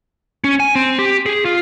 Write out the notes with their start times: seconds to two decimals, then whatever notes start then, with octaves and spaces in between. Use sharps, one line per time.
0.44 C#4
0.60 G#5
0.75 C4
0.99 G4
1.26 G#4
1.45 F4